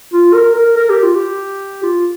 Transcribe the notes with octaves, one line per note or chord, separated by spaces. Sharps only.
F4
A#4
A#4
A#4
G4
F4
G4
F4